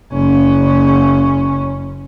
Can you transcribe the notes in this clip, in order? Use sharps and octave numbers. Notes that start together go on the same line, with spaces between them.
F#1 C#4